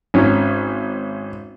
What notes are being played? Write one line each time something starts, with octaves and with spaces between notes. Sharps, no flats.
G#1 C#4